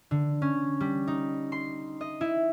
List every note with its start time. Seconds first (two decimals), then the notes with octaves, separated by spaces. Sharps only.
0.11 D3
0.42 C#4
0.80 G3
1.07 D#4
1.52 C6
2.01 D#5
2.21 E4